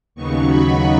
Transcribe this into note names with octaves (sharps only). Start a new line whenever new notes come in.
D#2 C#3 F#3 B3 D#4 C#6
B5